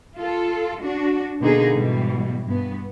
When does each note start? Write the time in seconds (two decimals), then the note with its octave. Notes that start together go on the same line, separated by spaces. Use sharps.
0.17 F4 A4
0.82 D4 F#4
1.40 B2 D3 A#3 D#4 G#4
1.75 G#2 B2 E3 G3
2.45 G2 B3